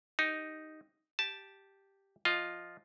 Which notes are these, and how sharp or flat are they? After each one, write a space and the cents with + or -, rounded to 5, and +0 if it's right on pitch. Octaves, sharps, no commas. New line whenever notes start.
D#4 +0 G4 +0
G4 +0 A5 +0
F3 +0 F4 +5 D#5 +0